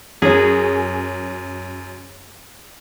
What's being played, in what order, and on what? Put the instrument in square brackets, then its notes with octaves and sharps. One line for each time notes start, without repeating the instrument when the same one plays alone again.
[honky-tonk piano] F#2 C#5 [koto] G#4